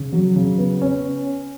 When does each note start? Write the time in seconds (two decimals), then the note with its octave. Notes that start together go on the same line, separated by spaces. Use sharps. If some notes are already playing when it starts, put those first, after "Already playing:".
Already playing: C#3
0.12 F#3
0.36 C#3
0.58 B3
0.82 C#4